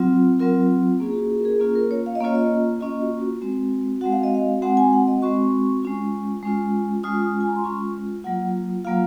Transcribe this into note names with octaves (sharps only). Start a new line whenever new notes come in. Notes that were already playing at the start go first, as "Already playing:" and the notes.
Already playing: F#3 C4 F4
F#3 C4 F4 A#4
A#3 C#4 F4 G#4
G#4
F#4
G#4
A#4
G#4
A#3 C#4 F4 G#4
A#4
C#5
F5
D#5
A#3 C#4 F4 C#5
D#5
A#3 C#4 F4 D#5
F#4
F#4
G#3 C4 F#4
G#3 C4 F#4 F#5
F5
D#5
F5
G#3 C4 F#4 F#5
G#5
F#5
D#5
G#3 C4 F#4 C#6
G#3 C#4 F4
G#3 C#4 F4
G#3 C#4 F4 D#6
G#5
A#5
C6
G#3 C#4 F4 C#6
F#3 A#3 F4 F#5
F#3 A#3 F4 F5